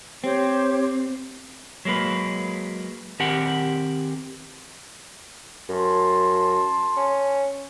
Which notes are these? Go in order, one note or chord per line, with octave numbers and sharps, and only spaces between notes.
C4 G4 C5 C#5
F#3 G#3 A#3 B4
D#3 C4 G4 G#4 A#4 F#5
F#2 A5 C6
C#4